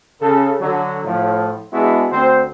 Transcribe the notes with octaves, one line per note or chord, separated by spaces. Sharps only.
C#3 A4
D3 F#3
A2 F3
G#3 B3 D4 E4 F#4 G#4
D2 C4 C5